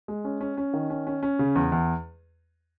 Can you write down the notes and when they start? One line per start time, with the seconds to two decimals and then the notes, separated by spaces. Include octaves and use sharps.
0.08 G#3
0.25 C#4
0.41 C#4
0.57 C#4
0.73 D#3
0.90 C#4
1.07 C#4
1.23 C#4
1.39 C#3
1.56 E2
1.72 E2